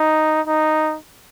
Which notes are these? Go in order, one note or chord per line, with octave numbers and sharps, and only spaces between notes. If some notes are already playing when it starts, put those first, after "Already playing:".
Already playing: D#4
D#4